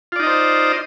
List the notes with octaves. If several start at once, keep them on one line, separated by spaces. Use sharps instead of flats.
D#4 F4 C5 D5 D#5